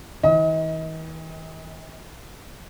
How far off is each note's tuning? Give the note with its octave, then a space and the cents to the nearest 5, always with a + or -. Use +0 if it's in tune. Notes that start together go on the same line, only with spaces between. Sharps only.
E3 -45 D#5 +35